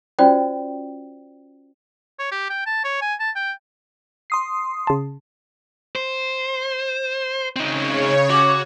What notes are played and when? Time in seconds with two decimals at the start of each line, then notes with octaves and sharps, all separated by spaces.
0.19 C#4 F4 F#4 C5 D5 G5
2.19 C#5
2.32 G4
2.50 G5
2.66 A5
2.84 C#5
3.01 G#5
3.20 A5
3.36 G5
4.30 C6 D#6 C7
4.87 C#3 A5
5.95 C5
7.56 C#3 C4 D#4 C#5
8.30 F#4 D6